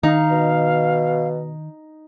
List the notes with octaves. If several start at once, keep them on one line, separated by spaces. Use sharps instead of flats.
D#3 D#4 F5
B2